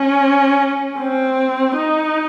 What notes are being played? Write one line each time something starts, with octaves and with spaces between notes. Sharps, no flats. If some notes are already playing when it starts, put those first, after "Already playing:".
Already playing: C#4
C4
D#4